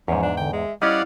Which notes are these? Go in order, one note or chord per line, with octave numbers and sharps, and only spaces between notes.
E2 G#2 F3 C#4
D4
D3 G5
G#3 E5
G3 C#4 E4 D5 D#5 F5 F#5